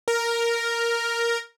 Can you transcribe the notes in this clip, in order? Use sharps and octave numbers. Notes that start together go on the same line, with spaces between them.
A#4